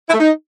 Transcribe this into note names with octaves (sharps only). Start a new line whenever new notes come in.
E4
A3
D#4